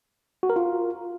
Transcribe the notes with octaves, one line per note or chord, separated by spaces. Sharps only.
F#4
A#4
F4